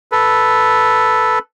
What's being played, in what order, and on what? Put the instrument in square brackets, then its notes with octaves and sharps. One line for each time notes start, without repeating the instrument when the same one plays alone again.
[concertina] A4 B4